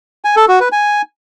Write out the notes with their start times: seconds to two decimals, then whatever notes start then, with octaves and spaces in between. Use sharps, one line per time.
0.25 G#5
0.37 A4
0.48 F#4
0.60 B4
0.72 G#5